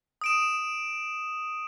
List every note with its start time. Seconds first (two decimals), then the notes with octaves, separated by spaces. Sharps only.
0.21 D#6 D7 E7